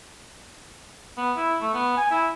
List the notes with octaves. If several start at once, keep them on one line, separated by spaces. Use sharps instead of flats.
B3
E4
A3
B3
G#5
E4